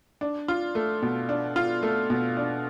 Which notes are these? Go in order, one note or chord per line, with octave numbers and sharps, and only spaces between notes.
D4
F4
A3
B2
D4
F4
A3
B2
D4